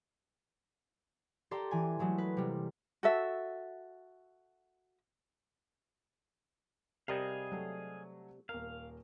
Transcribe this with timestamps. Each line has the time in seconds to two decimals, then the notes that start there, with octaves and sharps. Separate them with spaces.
1.51 G4 A4 D5 G5 A#5 C6
1.71 E3 G#5
1.99 E3 F#3 G#3 A3
2.18 B4
2.37 C3 G3 A#3
3.03 F#4 A4 E5
7.08 C3 G3 G#4 A#4 D#5 F5
7.52 F#3 A3
8.49 D#1 A#4 F5